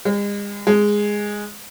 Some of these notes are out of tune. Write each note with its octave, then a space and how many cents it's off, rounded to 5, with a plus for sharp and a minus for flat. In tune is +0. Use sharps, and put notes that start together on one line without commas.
G#3 -40
G#3 -5